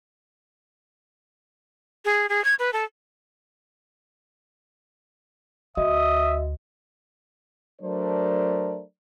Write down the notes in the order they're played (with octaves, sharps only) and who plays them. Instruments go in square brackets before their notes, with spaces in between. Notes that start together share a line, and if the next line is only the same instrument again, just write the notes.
[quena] G#4
G#4
G#6
B4
A4
[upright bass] D2 [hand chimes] F#4 D#5 [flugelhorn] E5 [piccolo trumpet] D#6
[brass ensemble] F#3 A3 D4 A#4 C5 D5